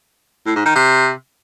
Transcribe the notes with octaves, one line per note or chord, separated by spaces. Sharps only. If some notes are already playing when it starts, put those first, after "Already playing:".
A2
G#2
D#3
C3